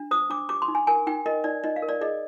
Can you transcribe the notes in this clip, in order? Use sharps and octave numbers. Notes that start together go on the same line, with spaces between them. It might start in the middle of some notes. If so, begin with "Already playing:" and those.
Already playing: D4
C5 D#6
D4 D6
G4 D6
C6
D#4
G#5
A#4 G#5
D#4 G5
A#4 D#5
D#4 D5
D#4 D#5
F5
A#4
D5
G#4 D#5